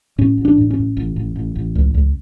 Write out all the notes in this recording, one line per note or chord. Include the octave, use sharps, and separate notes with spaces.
A2 C#4
A1
D4
A2
C#4
A2
A1
A1
A1
A1
C#2
C#2